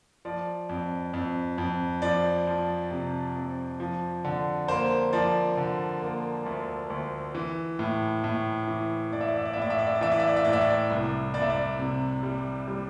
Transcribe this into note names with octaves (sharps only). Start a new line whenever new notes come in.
F3 D5
F2
F2
F2
F3 D5
F3
C3
F2
F3
D3
A#3 C5
F3 D5
D3
A#3
D2
D2
E3
A2
A2
E3
E3 D5
E5
D5
E5
D5
E5
A2 D5
E5
D5
E5
D5
E3 E5
D5
E5
D5
E5
A2 D5
E5
D5
C2
C2 D5
E5
D5
C3
G3
G3